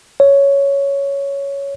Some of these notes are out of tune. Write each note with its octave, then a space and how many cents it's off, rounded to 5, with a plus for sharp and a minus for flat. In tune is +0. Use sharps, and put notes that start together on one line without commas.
C#5 +5